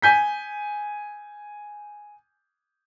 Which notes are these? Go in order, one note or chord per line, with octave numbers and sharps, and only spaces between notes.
G#5 G6 B6